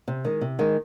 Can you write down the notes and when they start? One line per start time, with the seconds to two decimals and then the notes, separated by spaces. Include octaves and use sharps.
0.08 C3
0.25 D#3 G#3
0.41 C3
0.59 D#3 G#3